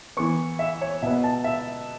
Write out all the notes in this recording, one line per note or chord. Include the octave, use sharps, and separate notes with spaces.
E3 B3 C#6
E5
C#5
B2 B3 E5
A5
E5